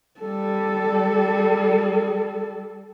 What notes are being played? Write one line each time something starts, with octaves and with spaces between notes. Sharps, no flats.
G3 A4